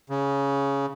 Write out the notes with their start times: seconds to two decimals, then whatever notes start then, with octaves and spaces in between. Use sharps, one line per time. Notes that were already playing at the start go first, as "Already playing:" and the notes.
0.10 C#3